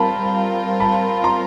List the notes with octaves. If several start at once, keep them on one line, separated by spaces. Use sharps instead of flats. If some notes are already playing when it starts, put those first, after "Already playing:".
Already playing: G3 C4 F4 A#4 A5 B5
A5 B5
A#5 C6